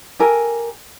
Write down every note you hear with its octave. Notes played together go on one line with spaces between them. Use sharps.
G4 A4 A#4 G#5